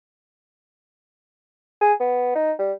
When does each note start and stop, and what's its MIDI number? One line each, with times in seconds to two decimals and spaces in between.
1.81 1.93 68
2.00 2.35 59
2.35 2.52 63
2.59 2.72 55